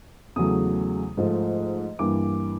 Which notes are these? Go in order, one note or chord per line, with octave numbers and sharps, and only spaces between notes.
E2 C#3 F#3 A3 D#6
G#2 F3 A3
G2 E3 G3 A#3 D6